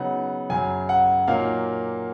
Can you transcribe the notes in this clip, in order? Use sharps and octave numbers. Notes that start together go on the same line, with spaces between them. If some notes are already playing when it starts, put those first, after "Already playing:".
Already playing: C#3 F#3 B3 D#4 F#5
F#2 C#3 F#3 G#5
F#5
A#2 F#3 A#3 D#4 F5